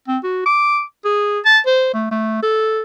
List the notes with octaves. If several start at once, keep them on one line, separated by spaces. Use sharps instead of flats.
C4
F#4
D6
G#4
A5
C5
A3
A3
A4